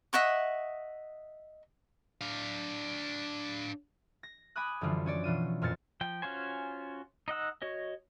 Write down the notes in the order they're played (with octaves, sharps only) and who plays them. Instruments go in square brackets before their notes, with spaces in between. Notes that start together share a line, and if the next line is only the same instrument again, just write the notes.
[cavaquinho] D#5 E5 F#5 C#6
[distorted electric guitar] D4 F5
[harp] A#6
G#5 B5 D6 D#6 F#6
F#2 D3 E3 F3 G3 F4
C#4 C#5 D5
B2 E3 F4 D#7
F2 A#2 F6 G#6 A6 C#7
[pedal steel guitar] F3 G5
C#4 F4 F#4 C5 G#5
D#4 D#5 F#5 E6
F#4 C#5 D#5